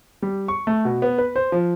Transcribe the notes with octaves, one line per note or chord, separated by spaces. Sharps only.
G3
C#6
A3
B2
B3
B4
C5
F3